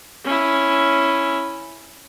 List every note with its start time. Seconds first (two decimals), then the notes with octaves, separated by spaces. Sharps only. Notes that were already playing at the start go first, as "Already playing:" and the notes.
0.25 C#4 E4